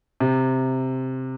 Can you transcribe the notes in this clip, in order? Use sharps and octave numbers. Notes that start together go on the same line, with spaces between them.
C3